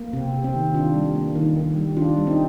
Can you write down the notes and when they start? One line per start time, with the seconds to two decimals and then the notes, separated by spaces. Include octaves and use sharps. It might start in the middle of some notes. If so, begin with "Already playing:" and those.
Already playing: A#3
0.13 C3 C4
0.34 C3
0.44 C4
0.54 D#3
0.74 D#3 D4 F4
0.95 G3
1.15 A#3
1.36 D#3
1.56 D#3
1.76 G3
1.96 D#3 D4 F4
2.17 G3
2.27 C4 D#4